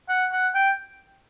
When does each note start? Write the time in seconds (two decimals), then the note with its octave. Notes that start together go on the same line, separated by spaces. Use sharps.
0.09 F#5
0.32 F#5
0.55 G5